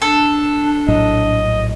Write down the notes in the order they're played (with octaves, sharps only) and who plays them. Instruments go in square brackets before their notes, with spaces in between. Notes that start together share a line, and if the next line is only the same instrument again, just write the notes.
[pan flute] D4 [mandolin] A4
[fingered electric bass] A#1 A2 F#3 [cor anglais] D#5